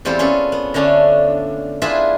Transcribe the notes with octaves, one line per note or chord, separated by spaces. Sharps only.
E2 G3 C4 F4 A4 C5
C#4 F4 G#4 A4 B4
B3
D3 A3 C#4 D4
D4 E4 F4 G#4 B4 E5